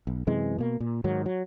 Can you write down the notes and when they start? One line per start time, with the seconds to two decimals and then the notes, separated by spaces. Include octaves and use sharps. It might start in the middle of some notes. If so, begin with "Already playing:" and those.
0.07 B1
0.27 F#2 C3 E3 G#3
0.58 B2 A#3
0.80 A#2
1.04 G#2 D#3 F#3
1.26 F#3